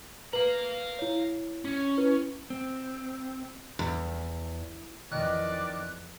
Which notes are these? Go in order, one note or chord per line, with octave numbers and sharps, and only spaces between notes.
B4 F5 A#5 F#7
E4 C#5
C#4
E4 B4
C4
E2
F2 D#3 E3 D5 F#6